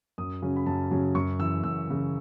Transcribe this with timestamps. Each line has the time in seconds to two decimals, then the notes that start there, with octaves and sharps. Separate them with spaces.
0.18 F#2 D#6
0.42 C#3 F#3 C#4
0.56 B5
0.66 F#2 A5
0.91 C#3 F#3 C#4
1.15 F#2 C#6
1.39 C#3 E3 E6
1.63 F#2 E6
1.88 C#3 E3